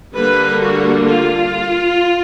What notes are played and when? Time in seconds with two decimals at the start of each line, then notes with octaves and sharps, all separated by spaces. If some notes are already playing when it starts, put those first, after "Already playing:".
0.15 D3 G3 A#3 B4
0.61 F#4
1.06 F4